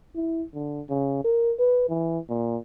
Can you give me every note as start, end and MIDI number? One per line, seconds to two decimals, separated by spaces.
0.15 0.43 64
0.54 0.81 50
0.89 1.21 49
1.24 1.53 70
1.59 1.86 71
1.89 2.18 52
2.29 2.57 46